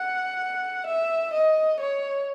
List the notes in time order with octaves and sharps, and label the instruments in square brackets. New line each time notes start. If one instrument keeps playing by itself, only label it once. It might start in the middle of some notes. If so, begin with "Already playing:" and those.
Already playing: [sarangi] F#5
E5
D#5
C#5